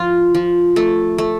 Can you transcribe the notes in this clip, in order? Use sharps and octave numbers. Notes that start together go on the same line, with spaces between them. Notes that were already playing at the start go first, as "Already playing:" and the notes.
Already playing: F3 F4
F3
A3
A3